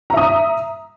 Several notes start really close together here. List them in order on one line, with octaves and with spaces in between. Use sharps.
A#5 E5 D#6